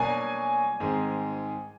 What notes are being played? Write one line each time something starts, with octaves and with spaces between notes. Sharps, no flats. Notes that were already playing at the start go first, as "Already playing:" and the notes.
Already playing: B2 F#3 A#3 D4 G#5
G#2 D#3 G#3 C4